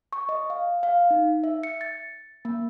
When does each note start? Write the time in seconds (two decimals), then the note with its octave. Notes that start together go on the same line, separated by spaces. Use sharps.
0.13 C#6
0.29 D#5
0.50 F5
0.83 F5
1.11 D#4
1.44 E5
1.63 C#7
1.81 A6
2.45 A#3